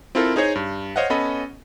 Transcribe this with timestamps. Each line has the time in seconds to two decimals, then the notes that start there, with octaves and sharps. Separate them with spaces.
0.15 C4 E4 F4 A4 A#4
0.36 D#4 G#4 C5 C#5 D#5
0.55 G2
0.96 C5 C#5 D#5 F5 F#5
1.10 B3 C#4 A4 D#5 B5